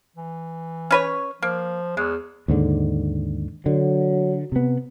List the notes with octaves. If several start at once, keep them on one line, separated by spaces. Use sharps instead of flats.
E3
C#4 B4 C#5
F3 A#3
E2 G#3
D#2 G#2 D3
D3 F#3
C3 B3